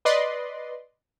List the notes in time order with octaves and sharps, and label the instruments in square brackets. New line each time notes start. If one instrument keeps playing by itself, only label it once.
[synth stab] B4 D5 D#5 C6